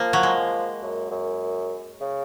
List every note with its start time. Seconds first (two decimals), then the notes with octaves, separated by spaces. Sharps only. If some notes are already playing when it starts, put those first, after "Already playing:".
Already playing: F3 A#3
0.13 F#3
0.23 G#3
0.82 F#2
1.11 F#2
2.01 C#3